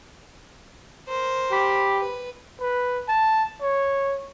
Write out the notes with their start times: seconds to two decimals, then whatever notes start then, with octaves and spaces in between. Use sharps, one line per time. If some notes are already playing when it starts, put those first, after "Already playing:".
1.08 A#4 C5
1.52 G4 B5
1.98 B4
2.61 B4
3.08 A5
3.61 C#5